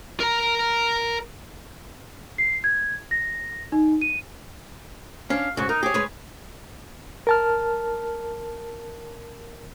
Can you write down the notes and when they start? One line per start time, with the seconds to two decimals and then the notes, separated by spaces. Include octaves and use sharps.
0.20 A#4 A#5
2.38 C7
2.64 G#6
3.11 A#6
3.72 D#4
4.01 D#7
5.30 C#4 D4 F5
5.57 G#2 C#3 F#4
5.69 D#4 A#4
5.83 G4 G#4 C#5
5.94 G#3 B4 C#5
7.27 A#4 A5 F6